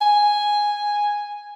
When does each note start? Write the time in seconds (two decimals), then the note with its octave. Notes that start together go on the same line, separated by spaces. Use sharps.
0.01 G#5